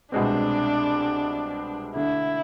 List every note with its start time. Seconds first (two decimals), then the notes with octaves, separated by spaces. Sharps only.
0.12 C2 B2 G#3 C4 D4
1.95 D3 A3 D4 E4